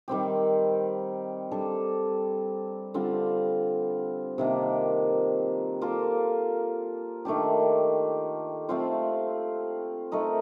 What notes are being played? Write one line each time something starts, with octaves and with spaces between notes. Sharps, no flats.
D#3 G3 C4 G4
G3 D4 A4
D3 G3 C4 F4
C3 D#3 A#3 D4
A#3 F4 A4
D#3 A3 D4 G4
A3 C4 F4 C5
A3 D#4 A#4 D#5